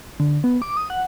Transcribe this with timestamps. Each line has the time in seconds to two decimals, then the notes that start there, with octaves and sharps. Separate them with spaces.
0.20 D3
0.44 B3
0.62 D6
0.77 D#6
0.90 F#5